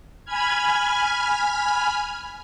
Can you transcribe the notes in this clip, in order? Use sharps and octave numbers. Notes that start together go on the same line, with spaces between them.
G#5 B5 F6 G#6